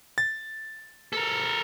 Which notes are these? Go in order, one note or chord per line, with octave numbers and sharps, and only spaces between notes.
A6
A4 A#4